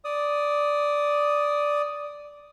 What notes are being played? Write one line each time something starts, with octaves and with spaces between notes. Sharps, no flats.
D5 D#6